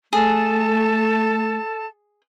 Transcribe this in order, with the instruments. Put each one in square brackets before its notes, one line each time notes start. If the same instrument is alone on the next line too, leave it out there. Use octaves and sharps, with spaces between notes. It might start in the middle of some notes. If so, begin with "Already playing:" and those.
[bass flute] A3 [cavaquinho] G#4 [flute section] A4 A5